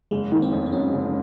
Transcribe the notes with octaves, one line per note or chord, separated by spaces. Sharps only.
F#1 G#3
D#3
C4
F2
C4
F#3 C#4
F#1